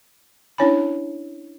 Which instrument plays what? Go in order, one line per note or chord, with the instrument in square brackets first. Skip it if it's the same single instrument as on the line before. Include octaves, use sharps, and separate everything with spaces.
[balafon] C#4 D4 E4 C#5 G#5 B5